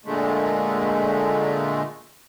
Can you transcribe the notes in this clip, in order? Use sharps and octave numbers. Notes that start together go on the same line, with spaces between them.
A#2 D3 G#3 A3